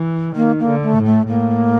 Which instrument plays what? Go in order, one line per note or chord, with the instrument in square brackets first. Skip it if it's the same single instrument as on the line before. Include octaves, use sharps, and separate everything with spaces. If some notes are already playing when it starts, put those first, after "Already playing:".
Already playing: [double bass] E3
[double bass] D#3 [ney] A#3
[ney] A#3
[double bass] D3
[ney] A3
[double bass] A2
[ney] A3
[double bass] A2 [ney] A#3